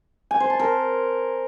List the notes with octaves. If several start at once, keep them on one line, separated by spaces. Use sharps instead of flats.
G#5
C5
A5
A#4